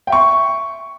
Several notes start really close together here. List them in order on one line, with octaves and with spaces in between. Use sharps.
G5 E5 C#6 C6